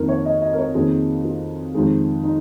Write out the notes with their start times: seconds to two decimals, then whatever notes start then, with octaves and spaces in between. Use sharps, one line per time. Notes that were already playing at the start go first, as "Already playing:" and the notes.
Already playing: F2 D#3 A#3 A#4
0.08 C#5
0.25 D#5
0.42 D#5
0.54 A#4
0.58 C#5
0.75 F2 D#3 A#3 G#4
1.25 F4
1.74 F2 D#3 G#3
2.23 D#4